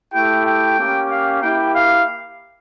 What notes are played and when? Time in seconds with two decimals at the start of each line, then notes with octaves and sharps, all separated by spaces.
0.14 A3 E4 G4 G5
0.46 G5
0.78 A#3 C#4 G4
1.10 F5
1.41 A#3 E4 G4 G5
1.74 F5